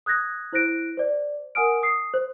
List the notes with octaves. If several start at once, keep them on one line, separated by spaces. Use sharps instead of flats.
D#6 F#6 G#6 A#6
E4 C5 F#6 A#6 D7
C5 D5
A#4 F#5 G#5 D#6 F6 D7
D#6 C7
C5